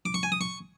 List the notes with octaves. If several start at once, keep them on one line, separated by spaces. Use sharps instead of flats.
D6
C#6
G#5
D#6
C#6